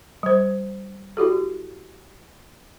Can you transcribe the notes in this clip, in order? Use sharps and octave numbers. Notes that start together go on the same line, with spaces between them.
G3 C5
E4 F#4 G4 A4